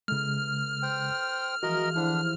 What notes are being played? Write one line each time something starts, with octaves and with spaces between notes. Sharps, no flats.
C#3 G#3 B3 E4 A4 F6
C5 G5
E3 F3 G#3 F#4 A#4 D#5
D3 D4 E4 F4 G4 C5